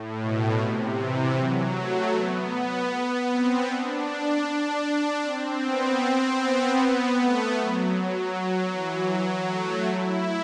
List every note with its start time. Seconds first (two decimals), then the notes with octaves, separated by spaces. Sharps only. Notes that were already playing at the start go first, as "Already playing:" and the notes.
Already playing: A2
0.20 B2
0.59 C3
0.97 E3
1.36 F#3
1.74 A3
2.13 B3
3.29 C4
3.67 D4
4.07 D4
4.45 D4
5.22 C4
5.61 B3
5.99 C4
6.38 B3
7.16 A3
7.54 F#3
7.93 F#3
8.70 E3
9.09 F#3
9.47 A3
9.86 E4